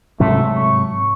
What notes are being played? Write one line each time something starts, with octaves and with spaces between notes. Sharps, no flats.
G#2 C3 F#3 A3
C#6